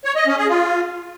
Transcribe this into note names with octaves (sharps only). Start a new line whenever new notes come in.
C#5
D#5
C#4
G#4
F4